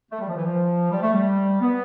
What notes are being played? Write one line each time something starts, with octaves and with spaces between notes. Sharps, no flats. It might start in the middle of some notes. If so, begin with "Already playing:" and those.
A3
G3
F3
E3
F3
G3
A3
G3
B3